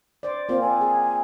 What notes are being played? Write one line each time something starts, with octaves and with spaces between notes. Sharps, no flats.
C5 D5
A#3 C4 F4 C5
G#5
G#4